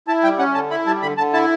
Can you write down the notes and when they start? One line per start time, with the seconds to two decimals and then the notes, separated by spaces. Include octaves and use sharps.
0.08 E4 A5
0.23 G3 G5
0.39 C#4 F#5
0.54 D3 A5
0.70 E4 B5
0.86 G3 A5
1.02 D3 B5
1.18 D3 A5
1.33 E4 A5